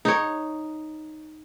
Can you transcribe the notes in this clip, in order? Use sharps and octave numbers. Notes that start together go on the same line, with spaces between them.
D#4 C#5